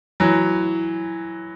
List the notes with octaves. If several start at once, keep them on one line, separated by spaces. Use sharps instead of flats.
E3 F#3